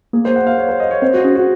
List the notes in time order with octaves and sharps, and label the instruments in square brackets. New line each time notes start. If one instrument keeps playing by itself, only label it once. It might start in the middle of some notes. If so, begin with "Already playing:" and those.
[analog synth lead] A#3 [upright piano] G#4
[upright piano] C5
F#5
F5
C#5
C5
D#5
C#5
[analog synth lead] C4 [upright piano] C5
[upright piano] F#4
[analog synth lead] C#4 [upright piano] G#4
[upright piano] F#4